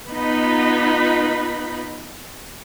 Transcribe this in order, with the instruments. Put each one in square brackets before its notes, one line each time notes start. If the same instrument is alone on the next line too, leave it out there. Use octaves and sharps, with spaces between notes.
[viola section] B3 D#4 F4 B5